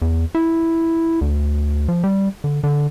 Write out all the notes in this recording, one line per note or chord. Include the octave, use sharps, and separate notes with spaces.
E2
E4
D2
F3
G3
D3
D3